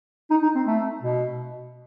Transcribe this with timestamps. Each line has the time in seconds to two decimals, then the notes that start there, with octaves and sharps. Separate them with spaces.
0.30 D#4
0.43 D#4
0.55 C4
0.66 A3
1.03 B2